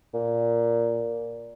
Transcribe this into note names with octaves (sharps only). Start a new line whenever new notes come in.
A#2